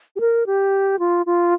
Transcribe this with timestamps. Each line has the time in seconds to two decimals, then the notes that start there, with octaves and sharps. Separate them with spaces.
0.16 G4
0.20 A#4
0.46 G4
0.99 F4
1.26 F4